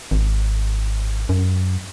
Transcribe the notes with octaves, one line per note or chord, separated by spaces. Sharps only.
G#1
F#2